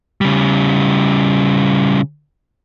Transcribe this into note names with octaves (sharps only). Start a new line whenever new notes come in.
C#3 G3